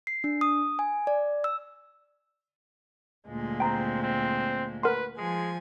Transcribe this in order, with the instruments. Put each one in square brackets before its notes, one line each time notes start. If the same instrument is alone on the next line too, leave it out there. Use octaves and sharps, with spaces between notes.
[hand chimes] C7
D4
D#6
G#5
D5
E6
[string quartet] D2 A#2 G#3
[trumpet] C4 [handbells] G5 A#5
[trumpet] C4
[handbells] A#4 F#5 C6 [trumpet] B4
[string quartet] F3 G#5 [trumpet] G#3